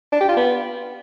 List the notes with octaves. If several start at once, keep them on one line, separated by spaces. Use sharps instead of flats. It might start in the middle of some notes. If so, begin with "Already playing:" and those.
D4
G4
F4
B3